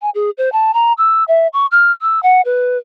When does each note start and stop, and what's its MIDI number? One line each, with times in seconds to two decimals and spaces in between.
0.02 0.10 80
0.15 0.30 68
0.38 0.49 72
0.53 0.72 81
0.74 0.93 82
0.98 1.24 88
1.28 1.47 76
1.53 1.66 85
1.72 1.92 89
2.02 2.22 88
2.23 2.41 78
2.45 2.78 71